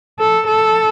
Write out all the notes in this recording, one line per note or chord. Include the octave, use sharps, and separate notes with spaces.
A4
A4